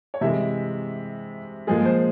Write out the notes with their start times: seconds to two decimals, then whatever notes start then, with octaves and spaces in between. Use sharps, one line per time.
0.14 C#5
0.21 C3 E3 G#3 E5
1.67 A#2 F3 G#3 G#4
1.85 C5